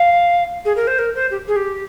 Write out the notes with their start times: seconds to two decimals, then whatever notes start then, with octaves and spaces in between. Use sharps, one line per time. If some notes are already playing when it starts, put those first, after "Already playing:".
Already playing: F5
0.65 G#4
0.76 A#4
0.87 C5
0.98 A#4
1.15 C5
1.31 G4
1.47 G#4
1.56 G4